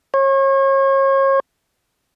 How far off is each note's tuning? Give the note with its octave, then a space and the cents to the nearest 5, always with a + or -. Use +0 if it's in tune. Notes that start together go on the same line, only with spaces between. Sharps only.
C#5 -35